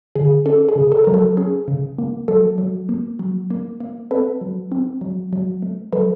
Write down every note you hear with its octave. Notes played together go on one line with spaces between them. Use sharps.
D3 G#4
C#4 A4
G#4
C#3
A4
F#3 A#4
A4
C#4 G#4
C#3
A#3
F#3 A4
F#3
A#3
F#3
A#3
A#3
C4 A4 B4
F#3
C4
F#3
F#3
A3
F#3 A4 B4